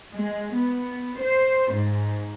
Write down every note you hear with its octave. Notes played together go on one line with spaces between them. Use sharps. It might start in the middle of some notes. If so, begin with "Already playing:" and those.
G#3
B3
C5
G#2